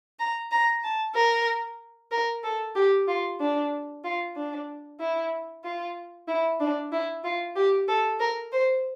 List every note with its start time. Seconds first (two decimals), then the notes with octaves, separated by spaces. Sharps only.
0.19 A#5
0.52 A#5
0.84 A5
1.15 A#4
2.12 A#4
2.44 A4
2.76 G4
3.08 F4
3.40 D4
4.04 F4
4.36 D4
5.00 E4
5.64 F4
6.28 E4
6.60 D4
6.92 E4
7.24 F4
7.56 G4
7.88 A4
8.20 A#4
8.52 C5